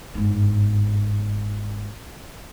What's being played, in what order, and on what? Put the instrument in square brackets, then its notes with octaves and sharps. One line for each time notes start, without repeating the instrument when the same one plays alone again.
[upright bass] G1 G#2